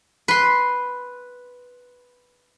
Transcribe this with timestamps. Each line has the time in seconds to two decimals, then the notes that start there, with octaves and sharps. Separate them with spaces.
0.28 B4 C6